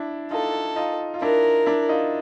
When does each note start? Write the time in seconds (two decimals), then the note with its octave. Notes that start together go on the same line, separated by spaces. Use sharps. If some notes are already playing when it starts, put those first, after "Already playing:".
Already playing: D4 E4
0.31 D#4 F4 A4
0.76 D#4 F4
1.14 F4
1.21 D4 E4 A#4
1.66 D4 E4
1.89 D#4 F4